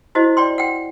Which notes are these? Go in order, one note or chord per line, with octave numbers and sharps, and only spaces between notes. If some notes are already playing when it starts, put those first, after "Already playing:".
E4 F#4 C5 D#5
D5 G5 C6
F#5 G5